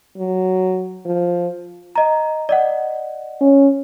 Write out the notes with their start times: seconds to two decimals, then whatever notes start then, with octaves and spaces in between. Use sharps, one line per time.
0.17 F#3
1.05 F3
1.95 D#5 A#5
2.49 D5 D#5 F#5
3.41 C#4